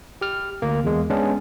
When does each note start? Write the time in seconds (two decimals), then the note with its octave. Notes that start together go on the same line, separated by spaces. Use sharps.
0.21 G4 F6
0.62 D2 A#3
0.84 E2 G#3
1.10 G#3 B3 C#4 D4